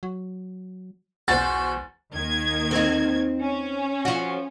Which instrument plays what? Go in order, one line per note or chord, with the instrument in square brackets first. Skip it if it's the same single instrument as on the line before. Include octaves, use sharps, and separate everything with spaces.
[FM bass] F#3
[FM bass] B1 [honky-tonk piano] E2 C5 [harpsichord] F#4 [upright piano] A6
[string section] D#2 D#3 G#6
[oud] C4 D#4
[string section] C#4
[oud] F3 F#4